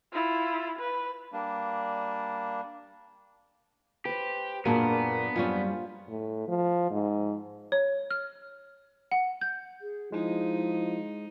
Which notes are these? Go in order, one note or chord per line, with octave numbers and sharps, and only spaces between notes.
E4 F4
B4
G3 A#3 D4
G4 B4 C5
F#2 A#2 A#3 B3 D4 F#4 G#4
F#2 G3 C#4 F4 C5
A2
F3
G#2
C#5
F6
F#5
G6
G#4
F3 G#3 D#4 E4